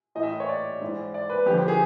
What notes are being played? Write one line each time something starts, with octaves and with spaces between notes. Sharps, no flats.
A2 E3 D#5
E5
C#5
D5
G#2 E3
D5
B4
F2 D3 F3 G4
G4
G#4